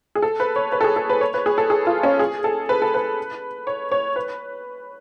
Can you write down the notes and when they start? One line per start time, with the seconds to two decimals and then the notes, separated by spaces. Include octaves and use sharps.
0.15 G#4
0.22 A4
0.40 B4
0.56 C#5
0.72 B4
0.81 A4
0.84 G#4
0.96 A4
1.10 B4
1.21 C#5
1.34 B4
1.46 G#4
1.58 A4
1.70 G#4
1.87 F4
2.03 C#4
2.19 G#4
2.44 A4
2.69 B4
2.82 A4
2.94 B4
3.67 C#5
3.92 C#5
4.16 B4